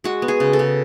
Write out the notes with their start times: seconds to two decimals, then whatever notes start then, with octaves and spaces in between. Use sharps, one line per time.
0.04 G#3 F#4
0.22 B3
0.28 G#4
0.40 C#3
0.53 A4
0.59 C#3